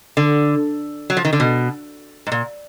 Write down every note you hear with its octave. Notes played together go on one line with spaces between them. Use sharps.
D3
F#3
F3
D#3
D3
B2
G#2
A#2